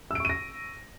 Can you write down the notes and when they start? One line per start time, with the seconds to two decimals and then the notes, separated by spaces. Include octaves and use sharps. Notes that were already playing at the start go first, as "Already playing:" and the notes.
0.11 E6
0.15 D7
0.20 C#6
0.25 D#7
0.29 A#6